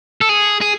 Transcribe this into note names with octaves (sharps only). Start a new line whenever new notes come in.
A4
G#4
G#4